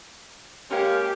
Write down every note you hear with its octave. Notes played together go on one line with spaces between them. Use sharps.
G#3 A#3 C#4 G4